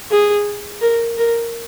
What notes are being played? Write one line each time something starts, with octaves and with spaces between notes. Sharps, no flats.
G#4
A#4
A#4